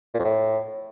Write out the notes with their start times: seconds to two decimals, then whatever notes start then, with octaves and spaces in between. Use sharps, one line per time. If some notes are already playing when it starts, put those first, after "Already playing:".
0.14 A#2
0.19 F2
0.24 A2